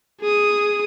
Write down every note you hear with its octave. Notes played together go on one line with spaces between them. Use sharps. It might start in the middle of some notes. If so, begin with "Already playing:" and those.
G#4 D#6